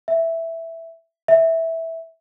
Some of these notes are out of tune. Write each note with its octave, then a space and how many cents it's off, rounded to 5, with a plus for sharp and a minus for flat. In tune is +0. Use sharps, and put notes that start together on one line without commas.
E5 +0
E5 -10